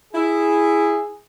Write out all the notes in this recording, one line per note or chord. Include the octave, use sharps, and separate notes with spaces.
E4 G#4